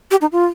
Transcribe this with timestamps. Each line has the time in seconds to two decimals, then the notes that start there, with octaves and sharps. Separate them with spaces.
0.11 G4
0.21 D#4
0.32 F4